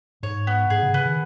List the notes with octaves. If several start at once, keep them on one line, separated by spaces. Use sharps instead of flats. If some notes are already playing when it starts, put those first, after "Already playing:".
G#2 C#5
B3
G#2 G#4
C#3
C#3 B3
D#3